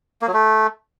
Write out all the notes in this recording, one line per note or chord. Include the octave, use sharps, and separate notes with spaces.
A#3
F#3
A3